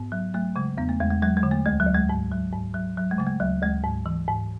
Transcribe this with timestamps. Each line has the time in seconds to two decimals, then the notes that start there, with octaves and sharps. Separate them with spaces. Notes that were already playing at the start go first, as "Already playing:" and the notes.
Already playing: G#2 B3
0.12 F#3
0.34 F#3 A3
0.56 C#3 G#3
0.77 E2 B3
0.89 A3
1.00 E2 G#3
1.10 G#3
1.22 F#3 G#3
1.37 G#3
1.43 D3
1.51 A3
1.66 D2 G#3
1.80 F#3
1.87 D2
1.94 G#3
2.09 G#2
2.31 F#3
2.53 G#2
2.74 F#3
2.97 F#3
3.11 G#3
3.18 C#3 A3
3.26 G#3
3.40 D2 F#3
3.62 D2 G#3
3.84 G#2
4.06 E3
4.28 G#2